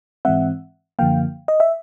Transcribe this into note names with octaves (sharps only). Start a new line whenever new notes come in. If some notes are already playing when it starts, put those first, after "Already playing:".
G#2 E3 G#3 C4 E5 F#5
F#2 D3 F3 A#3 F5 G5
D#5
E5